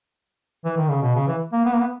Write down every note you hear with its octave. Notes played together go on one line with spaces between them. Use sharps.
E3
D#3
C#3
B2
C#3
E3
A#3
B3
A#3
B3